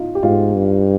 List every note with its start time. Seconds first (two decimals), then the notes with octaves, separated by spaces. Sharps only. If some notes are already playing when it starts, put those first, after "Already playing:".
Already playing: D#4 F4
0.15 G4
0.23 G#2 F4
0.55 G2